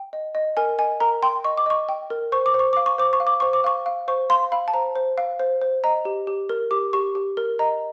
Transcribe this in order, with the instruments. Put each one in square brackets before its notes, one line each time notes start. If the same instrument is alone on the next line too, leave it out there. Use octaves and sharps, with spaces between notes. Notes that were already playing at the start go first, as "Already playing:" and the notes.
Already playing: [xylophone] G5
D#5
D#5
A#4 G#5
D#5 G#5
A#4 A#5
G5 C6
D#5 C#6
D6
D#5 C#6
G5
A#4
C5 C#6
D6
C5
C#6
F5 D6
C#6
C5 D6
C#6
F5
D6
C5 C#6
D6
F5 C#6
F5
C5 C#6
F5 C6
F5 B5
A5
C5 A#5
C5
F5
C5
C5
D#5 A#5
G4
G4
A#4
G4 D6
G4 C#6
G4
A#4
D#5 A#5